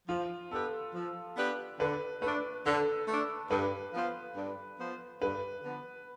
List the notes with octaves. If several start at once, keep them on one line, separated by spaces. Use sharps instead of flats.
F3 F4
B3 D4 G4 A4 B4
F3
B3 D4 G4 B4
D3 B4
A3 D4 B4
D3 A4
A3 D4
G2 B4
F3 B3 F4 C5
G2
F3 B3 F4 C5
G2 B4
D3 F3 B3